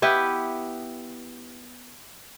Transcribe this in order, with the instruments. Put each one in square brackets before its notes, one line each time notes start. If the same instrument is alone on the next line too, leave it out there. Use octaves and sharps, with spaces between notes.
[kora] B3 E4 G4 B4